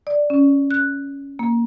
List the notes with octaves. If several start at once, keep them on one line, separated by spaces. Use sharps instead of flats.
D5
C#4
F#6
A#3